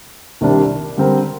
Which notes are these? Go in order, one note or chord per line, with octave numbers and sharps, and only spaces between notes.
C2 C3 D#3 G3 D4
D3 G3 C4 G4 A#4